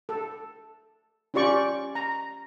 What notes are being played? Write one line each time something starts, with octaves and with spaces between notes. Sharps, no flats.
A4
C#4 F4 G4 D5 C#6
A#5